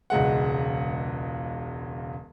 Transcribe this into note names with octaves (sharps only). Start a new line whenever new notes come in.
E1 C#2 G#3 F#5